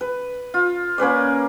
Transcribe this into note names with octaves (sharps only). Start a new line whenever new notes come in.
B4
F4
A#3 C#4 B4 D5